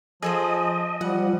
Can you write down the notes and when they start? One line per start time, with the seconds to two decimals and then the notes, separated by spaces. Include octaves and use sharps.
0.22 F3 G#4 A4 C5 D#5
1.01 F3 G3 F#5